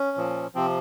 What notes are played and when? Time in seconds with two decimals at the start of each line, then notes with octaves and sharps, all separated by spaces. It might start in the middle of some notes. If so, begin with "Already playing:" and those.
Already playing: C#4
0.17 A#2 F3
0.55 C3 F3 C4